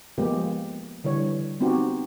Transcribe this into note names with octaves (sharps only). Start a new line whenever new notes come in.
F3 G#3 A#3 B3 G4
D3 E3 G3 C#5
B3 C4 D#4 F#4 G4